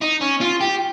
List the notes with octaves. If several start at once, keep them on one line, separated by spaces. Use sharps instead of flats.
D#4
C#4
F4
G4